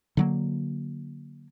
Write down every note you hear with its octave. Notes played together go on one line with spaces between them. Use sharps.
D3 F#3 A#3